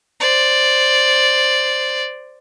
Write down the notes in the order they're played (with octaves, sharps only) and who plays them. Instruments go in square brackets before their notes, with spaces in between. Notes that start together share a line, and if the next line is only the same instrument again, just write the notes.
[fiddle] C5 D5